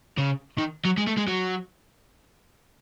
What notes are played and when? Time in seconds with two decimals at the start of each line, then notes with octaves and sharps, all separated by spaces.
0.18 C#3
0.58 D#3
0.85 F#3
0.98 G#3
1.07 A3
1.18 G#3
1.28 F#3